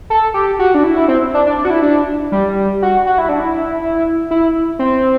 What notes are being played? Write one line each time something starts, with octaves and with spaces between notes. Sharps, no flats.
A4
G4
F#4
D4
E4
E4
C4
D4
D4
D4
F#4
E4
D4
G3
F#4
F#4
E4
D4
E4
E4
C4